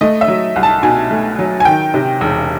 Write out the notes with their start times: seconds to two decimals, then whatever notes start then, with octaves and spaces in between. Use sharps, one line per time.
0.01 A3 D#5
0.21 E5
0.28 F#3
0.56 C2
0.63 A5
0.83 B2 G#5
1.11 A3
1.39 F#3
1.60 G#5
1.65 D#3 G5
1.94 C3
2.21 E1